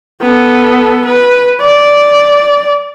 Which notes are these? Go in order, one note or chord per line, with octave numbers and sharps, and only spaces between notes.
B3 A4
B4
D5